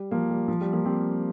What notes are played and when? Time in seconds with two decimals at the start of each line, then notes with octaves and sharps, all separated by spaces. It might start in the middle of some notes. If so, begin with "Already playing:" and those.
Already playing: G3
0.11 F3 A#3
0.30 G3
0.48 F3
0.61 G3
0.73 F3 A#3
0.85 G3 C4